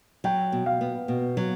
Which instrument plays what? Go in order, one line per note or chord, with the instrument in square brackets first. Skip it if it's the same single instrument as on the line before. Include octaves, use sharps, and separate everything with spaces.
[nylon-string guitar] F#3 [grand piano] G5
[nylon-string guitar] B2
[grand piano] F5
[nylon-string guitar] B3
B2
F#3